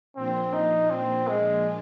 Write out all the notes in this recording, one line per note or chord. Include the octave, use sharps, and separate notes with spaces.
A#2 F3 A#3 C4 D4 F4
D#4
C4
G#3